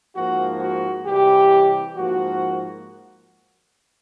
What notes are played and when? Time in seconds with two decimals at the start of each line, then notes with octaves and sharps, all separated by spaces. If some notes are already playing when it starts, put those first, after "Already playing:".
0.16 G#2 F3 A#3 F#4
0.61 F#4
1.06 C3 E3 G3 G4
1.96 G#2 F3 A#3 F#4